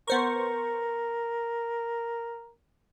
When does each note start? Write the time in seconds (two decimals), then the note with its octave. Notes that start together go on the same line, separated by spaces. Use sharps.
0.08 B3 A#4 C5 C#6